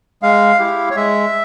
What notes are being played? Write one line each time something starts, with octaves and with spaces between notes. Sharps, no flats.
G#3 F5
E4 G4
C#5
G#3 E5